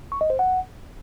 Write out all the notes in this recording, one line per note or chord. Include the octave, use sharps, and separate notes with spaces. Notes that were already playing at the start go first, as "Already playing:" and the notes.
C#6
D#5
C5
F#5